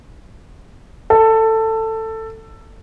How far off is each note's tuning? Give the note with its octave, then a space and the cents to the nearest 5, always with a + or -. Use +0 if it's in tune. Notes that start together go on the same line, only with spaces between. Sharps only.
A4 +15